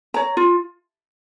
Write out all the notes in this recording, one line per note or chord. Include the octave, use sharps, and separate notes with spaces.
C#5 A#5
F4